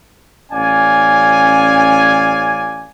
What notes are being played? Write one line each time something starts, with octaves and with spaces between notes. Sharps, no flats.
A1 C#4 D5 F5 G#5